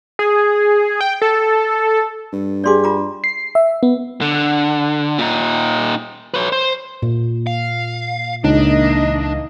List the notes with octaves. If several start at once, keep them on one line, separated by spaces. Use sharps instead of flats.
G#4
G5
A4
G2
D4 G4 G#4 D5 C6 D6
F4 A#5 D6
C7
E5
B3
D3
A#2 D#4
B4 C#5
C5
A#2
F5
C#2 E3 A#3 D4 D#4 D#5